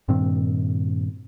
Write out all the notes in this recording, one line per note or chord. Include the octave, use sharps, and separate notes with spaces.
G2 A#2 D#3 C4